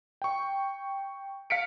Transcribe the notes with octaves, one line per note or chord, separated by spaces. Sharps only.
G5 C#6
F5 F6 B6 C#7 D7